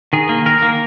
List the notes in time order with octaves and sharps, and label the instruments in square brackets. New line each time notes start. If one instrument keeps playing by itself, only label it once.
[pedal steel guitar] D#3 G#4
A#3
D#3 A#4
A#3